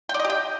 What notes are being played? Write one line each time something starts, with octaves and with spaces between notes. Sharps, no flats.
G5
D5
D#5
G4
G5